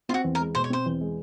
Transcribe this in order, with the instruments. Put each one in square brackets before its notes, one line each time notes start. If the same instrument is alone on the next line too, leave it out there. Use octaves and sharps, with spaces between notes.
[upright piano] C4 [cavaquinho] F4
[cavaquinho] F#4
[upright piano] E2
[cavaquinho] A#4
[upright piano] G#3
[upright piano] B2 [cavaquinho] C5
[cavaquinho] C#5
[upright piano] C4 [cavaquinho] C5
[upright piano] E2
G#3